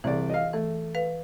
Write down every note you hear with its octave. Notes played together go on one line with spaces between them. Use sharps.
C2 E3 G#4 D5
D#5 F5
E3 A3
B4 F5